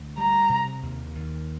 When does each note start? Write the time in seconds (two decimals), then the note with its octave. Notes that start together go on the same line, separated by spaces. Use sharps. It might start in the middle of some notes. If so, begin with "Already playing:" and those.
Already playing: D2
0.18 G3 A#5
0.49 C3
0.83 D#2
1.15 D#2